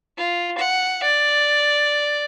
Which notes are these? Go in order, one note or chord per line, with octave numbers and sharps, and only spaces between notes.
F4
F#5
D5